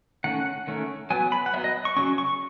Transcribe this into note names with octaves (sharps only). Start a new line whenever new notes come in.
D#3 A3 C#4 F#5
D#3 A3 C#4
F#3 B3 G#5
B5
F#5
F#3 B3 E5
D#5
C#6
C#3 F#3 C#4 C#6
C#6